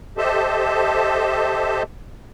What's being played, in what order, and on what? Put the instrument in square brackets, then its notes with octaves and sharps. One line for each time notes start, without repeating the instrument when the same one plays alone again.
[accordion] G4 A4 C5 D#5 E5 A5